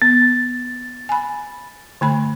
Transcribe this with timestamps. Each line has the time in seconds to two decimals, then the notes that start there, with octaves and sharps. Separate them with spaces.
0.02 B3 A6
1.09 G#5 B5
2.01 D3 A3 B5